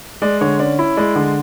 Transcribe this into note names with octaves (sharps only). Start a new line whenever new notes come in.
G#3 D5
D3 C#5
C#4 D5
E4
G#3 D5
D3